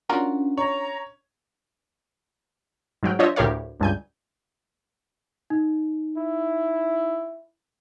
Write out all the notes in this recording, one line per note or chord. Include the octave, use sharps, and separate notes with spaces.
C#4 D4 F4 F#4 A#4
C#5 A#5
G#2 F#3 G5 F6
D4 F4 C5 C#5 D#5 E5
D2 A2 G4 A#4 C#5 F5
C#2 G2 G#5 G6
D#4
E4